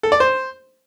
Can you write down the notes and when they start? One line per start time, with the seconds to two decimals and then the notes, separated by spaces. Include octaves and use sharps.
0.03 A4
0.12 D5
0.20 C5